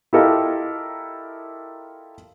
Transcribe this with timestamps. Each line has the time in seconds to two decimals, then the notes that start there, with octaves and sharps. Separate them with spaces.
0.13 E4 F4 G4 A4 A#4 D#5